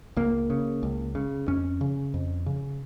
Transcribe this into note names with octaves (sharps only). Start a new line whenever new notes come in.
C#2 A#3
C#3
C#2
C#3
F2 C#4
C#3
F2
C#3